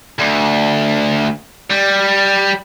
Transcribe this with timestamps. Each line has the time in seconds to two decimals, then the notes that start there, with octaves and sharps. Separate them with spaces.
0.20 D2
1.70 G3